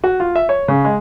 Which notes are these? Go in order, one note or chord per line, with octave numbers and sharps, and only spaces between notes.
F#4
F4
E5
C#5
C#3
G#3